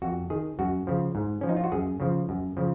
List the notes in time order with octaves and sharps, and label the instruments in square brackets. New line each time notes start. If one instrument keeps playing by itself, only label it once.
[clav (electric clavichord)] F2 F#4
D#3 G#4
F#2 F#4
C#3 F3
G#2
F3 C#4
D#4
F4
F#4
F#2 G#4
C#3 F3
F#2
C#3 F3